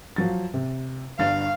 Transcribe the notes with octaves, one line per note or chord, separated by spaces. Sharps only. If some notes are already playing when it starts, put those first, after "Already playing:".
F3 F#3 A6
C3
G1 G2 F5 A6